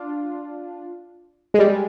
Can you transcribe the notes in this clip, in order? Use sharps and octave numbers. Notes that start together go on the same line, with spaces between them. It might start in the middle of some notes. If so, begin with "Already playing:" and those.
Already playing: D4 F4
G#3
G3